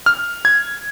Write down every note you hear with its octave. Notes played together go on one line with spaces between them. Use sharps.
F6
G#6